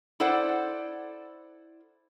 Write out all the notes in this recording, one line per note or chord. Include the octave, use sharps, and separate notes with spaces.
E4 A4 C5 D5 F#5